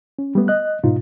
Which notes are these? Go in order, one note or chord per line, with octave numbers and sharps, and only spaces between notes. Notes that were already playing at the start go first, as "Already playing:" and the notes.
C#4
G3 A3 B3
D#5 F#6
G#2 B2 D#4 F4